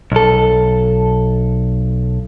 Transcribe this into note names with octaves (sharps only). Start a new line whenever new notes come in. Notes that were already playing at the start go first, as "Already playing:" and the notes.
B1 A4